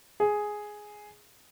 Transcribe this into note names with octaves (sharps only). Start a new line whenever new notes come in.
G#4